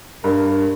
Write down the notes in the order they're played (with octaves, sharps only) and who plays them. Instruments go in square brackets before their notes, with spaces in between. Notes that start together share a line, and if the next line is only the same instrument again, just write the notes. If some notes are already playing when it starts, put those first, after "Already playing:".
[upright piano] G2 [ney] A#4